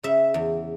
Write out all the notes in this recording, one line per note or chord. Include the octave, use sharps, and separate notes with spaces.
C#3 E5
E2